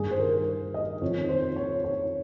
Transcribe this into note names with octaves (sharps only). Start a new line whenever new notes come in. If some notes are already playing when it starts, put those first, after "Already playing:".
Already playing: G2 D#3 G#4
C5
A#4
D#5
F2 D#3 C#5
C5
C#5
C#5